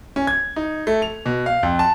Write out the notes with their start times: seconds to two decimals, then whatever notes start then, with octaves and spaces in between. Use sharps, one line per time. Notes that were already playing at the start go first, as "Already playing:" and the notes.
0.16 C#4
0.27 G#6
0.56 D#4
0.87 A3
1.02 F7
1.26 B2
1.46 F5
1.63 F2
1.79 A5